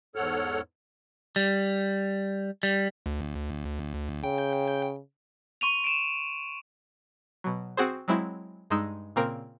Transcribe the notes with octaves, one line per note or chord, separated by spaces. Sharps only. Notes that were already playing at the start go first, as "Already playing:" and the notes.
E2 G#2 A4 C#5 F#5 F6
G3
G3
D2
C#3 G5
C6 C#6 D#7 F7
D7 E7
B2 F#3
C4 F#4 G#4 C5
F#3 G#3 C4 E4
G2 G#3 D#4 E6
A#2 C#3 A#3 C4 A#4